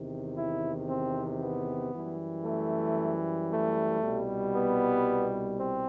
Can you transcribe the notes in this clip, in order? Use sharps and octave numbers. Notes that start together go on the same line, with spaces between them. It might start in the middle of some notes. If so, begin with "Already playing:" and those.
Already playing: E2 C3 D#3
E4
C4
B3
F#2 E3 G3
A3
A3
C2 B2 G3
B3
C4